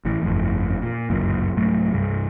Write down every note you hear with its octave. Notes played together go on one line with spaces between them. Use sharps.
G#1 A2 E3
G1 F2 A2
A#2
G1 C#2 F#2 A#2
C2 G#2 F#3 A3
C2 G2